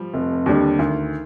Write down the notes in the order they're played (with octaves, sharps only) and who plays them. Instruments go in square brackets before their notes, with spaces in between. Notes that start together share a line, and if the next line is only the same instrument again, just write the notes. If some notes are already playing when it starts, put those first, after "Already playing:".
Already playing: [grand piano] F3 G3
[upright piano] F1
D#2 D3 G3
[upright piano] D2 [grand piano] D#3